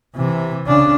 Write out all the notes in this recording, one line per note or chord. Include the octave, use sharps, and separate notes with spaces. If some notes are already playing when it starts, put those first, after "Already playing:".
C3 E3
C#3 D4